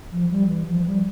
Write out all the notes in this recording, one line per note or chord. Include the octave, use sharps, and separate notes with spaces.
F3
G3
E3
F3
G3